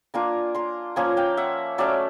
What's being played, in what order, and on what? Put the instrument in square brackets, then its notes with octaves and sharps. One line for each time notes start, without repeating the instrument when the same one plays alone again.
[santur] A#3 D4 F4 G#5 A#5
A#5 C6
F3 A#3 C#4 G#5 A#5
F5 G5
E5 F#5
F#3 A3 C#4 D5 E5